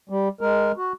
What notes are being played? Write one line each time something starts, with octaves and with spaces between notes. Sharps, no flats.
G3
G#3 A#4
F#4